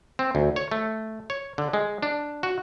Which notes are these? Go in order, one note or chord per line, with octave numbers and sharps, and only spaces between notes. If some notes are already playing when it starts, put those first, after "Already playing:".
C4
D2
C#5
A3
C#5
D3
G#3
D4
F#4